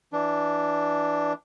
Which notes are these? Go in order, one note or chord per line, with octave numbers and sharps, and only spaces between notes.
E3 D4